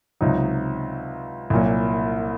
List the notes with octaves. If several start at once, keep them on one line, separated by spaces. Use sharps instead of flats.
C#2 C3 F#3 D#4
C2 A#2 F#3